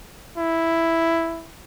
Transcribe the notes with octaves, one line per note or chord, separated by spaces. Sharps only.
E4